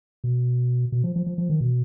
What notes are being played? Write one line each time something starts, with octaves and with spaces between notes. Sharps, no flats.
B2
B2
F3
F3
F3
F3
D#3
B2